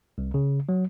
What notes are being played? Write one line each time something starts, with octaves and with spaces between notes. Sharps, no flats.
C2
C#3
F#3